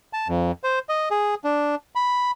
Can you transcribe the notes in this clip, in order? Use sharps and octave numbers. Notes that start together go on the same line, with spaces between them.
A5
F2
C5
D#5
G#4
D4
B5